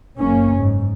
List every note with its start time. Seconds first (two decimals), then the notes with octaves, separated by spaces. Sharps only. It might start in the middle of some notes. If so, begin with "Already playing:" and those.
0.18 F#1 A#3 C#4
0.58 G#2